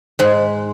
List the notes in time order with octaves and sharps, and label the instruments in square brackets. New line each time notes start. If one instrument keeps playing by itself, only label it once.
[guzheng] G#2 G#3 [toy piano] C5 G#5 C6